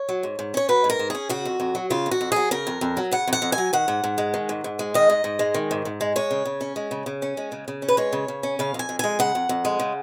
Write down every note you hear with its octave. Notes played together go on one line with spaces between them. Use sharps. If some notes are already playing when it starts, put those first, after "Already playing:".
Already playing: C#5
F#3
G#2
G#2
C#4 C#5
F#3 B4
G#2
A#4
G#2
C#4 G#4
C#3 F#4
F2
F2
F#3
C#3 F4
F2
F#4
F2
F#3 G#4
C#3 A#4
F2
F2
F#3
C#3 F#5
F2
F#5
F2
G#5
F#3
D#3 F#5
G#2
G#2
G#3
D#3
G#2
G#2
G#3
D#3 D#5
G#2
G#2
G#3
D#3
G#2
G#2
G#3
G#3 C#5
C#3
C#3
C#4
G#3
C#3
C#3
C#4
G#3
C#3
C#3
C#4
B4
G#3 C#5
C#3
C#3
C#4
C#3 F5
F2 G#5
F2
G#3 G#5
C#3 F#5
F2
F2
G#3
C#3